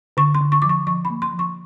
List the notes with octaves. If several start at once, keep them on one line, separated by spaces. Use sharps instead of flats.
D3 C#6
C6
D3
C#6
F3 D6
C#6
F3 C#6
B5
A#3
C6
F3
C#6